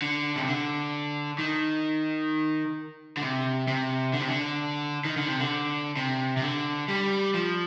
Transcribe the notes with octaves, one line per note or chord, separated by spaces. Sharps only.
D3
C3
D3
D#3
D3
C3
C3
D3
C3
D3
D#3
D3
C3
D3
C3
C3
D3
G3
F3